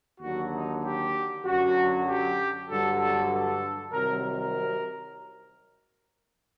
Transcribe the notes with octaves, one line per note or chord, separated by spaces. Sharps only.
D#2 D3 F#3 F#4
D#4
G4
F#2 D3 F#3 F#4
G4
G2 D3 F#3 A4
A4
A4
C2 C3 D#3 F#3 A#4
A#4